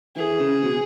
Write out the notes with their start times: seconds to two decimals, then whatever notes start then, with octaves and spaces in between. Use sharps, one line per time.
0.17 E3 G#4
0.40 C#3
0.63 B2